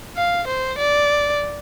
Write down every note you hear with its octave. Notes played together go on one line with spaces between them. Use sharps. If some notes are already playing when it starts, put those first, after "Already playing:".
F5
C5
D5